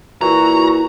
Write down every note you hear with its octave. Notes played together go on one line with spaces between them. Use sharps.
A#2 E3 E4 F#4 A#5